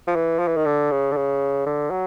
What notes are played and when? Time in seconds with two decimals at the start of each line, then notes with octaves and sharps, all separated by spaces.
0.07 F3
0.16 E3
0.39 F3
0.47 E3
0.56 D#3
0.66 D3
0.91 C#3
1.12 D3
1.16 C#3
1.66 D3
1.91 F#3